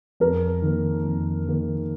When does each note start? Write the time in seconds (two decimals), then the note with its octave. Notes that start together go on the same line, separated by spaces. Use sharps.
0.20 F2 A#4
0.62 D#3 A#3
1.05 F2
1.47 D#3 A#3